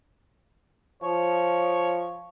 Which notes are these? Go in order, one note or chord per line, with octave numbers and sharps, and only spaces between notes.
F3 C#5